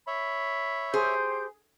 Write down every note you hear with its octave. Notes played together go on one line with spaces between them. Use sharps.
C#5 E5 B5
G4 G#4 C5 G6